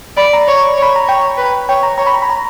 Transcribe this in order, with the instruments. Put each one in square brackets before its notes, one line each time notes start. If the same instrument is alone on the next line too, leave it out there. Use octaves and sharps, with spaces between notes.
[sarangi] D5 [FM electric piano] B5
[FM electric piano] A#5
[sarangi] C#5
C#5
[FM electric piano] B5
A#5
[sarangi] C#5 [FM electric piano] G5
[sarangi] B4
[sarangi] C#5 [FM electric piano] G5
[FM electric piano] A#5
[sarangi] C#5 [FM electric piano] A#5
[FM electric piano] B5
A#5
B5
A#5